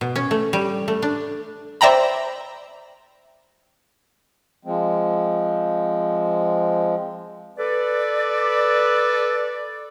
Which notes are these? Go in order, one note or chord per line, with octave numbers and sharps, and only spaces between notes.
B2
C#4
A3
G3
A3
D4
C5 D5 E5 G5 A#5 B5
F3 G#3 C4
A4 B4 D5